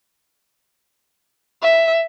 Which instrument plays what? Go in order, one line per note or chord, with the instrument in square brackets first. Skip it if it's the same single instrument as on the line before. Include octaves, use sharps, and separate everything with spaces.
[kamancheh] E5